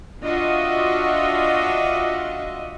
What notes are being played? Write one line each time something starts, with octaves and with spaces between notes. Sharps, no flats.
D4 F4 F#4 D#5 E5